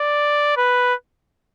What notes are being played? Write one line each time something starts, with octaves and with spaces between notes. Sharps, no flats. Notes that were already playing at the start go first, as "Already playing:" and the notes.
Already playing: D5
B4